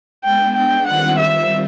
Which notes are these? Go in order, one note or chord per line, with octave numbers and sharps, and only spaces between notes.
G#3 B3 D4 G5
G5
D#3 G3 C4 F4 F#5
E5